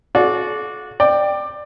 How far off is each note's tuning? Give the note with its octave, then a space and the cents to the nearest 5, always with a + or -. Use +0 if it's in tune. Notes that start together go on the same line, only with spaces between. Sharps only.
F#4 -20 A4 -45 D5 -10
D5 +20 G5 +0